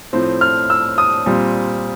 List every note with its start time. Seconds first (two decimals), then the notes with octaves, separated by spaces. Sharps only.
0.13 A2 F3 A3 C4
0.41 F6
0.70 E6
0.98 D#6
1.26 A#2 G3 C4